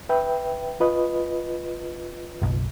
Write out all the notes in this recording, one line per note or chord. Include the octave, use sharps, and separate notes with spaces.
B4 E5 G5
F4 B4 D#5
F#1 B1